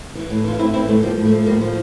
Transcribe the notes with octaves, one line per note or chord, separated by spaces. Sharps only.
E3
A2
E3 F4
A2 C4 E4
E3 C4 E4
A2 A3 C4
F3 G3 A#3
A2
A3
F3
A2 G3 A#3
F3